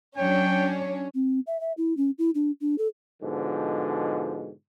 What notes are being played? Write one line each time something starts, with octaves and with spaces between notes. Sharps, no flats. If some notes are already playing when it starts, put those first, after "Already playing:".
F#3 C#4 D4 C#5 G5
C4
E5
E5
E4
C#4
E4
D4
D4
A4
G#2 B2 D3 F3